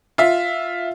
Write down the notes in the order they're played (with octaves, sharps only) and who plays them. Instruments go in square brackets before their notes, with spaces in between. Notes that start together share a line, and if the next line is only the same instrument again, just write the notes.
[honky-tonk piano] F4 E5